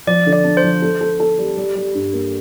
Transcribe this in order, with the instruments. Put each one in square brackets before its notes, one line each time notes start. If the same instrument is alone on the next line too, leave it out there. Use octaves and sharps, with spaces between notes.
[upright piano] F3 [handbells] D5
[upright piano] D3
[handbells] D5
[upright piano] D4
[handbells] C5
[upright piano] F3
A4
A4
A4
G3
G3
G3
G2
A#3